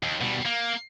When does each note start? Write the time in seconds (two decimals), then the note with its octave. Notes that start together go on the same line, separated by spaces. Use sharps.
0.03 D#2
0.21 B2 G3
0.46 A#3